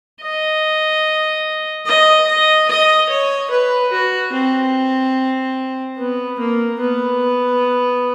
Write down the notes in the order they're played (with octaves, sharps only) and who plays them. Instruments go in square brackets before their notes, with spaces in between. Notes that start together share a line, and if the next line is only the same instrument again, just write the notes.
[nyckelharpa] D#5
D#5
D#5
D#5
C#5
B4
F#4
C4
B3
A#3
B3